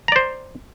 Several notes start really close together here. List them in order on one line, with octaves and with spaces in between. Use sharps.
A#5 D5 C5